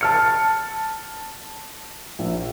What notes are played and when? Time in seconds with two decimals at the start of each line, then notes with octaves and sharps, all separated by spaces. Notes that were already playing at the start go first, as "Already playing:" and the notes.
0.01 A5 F6 C#7
2.19 A#1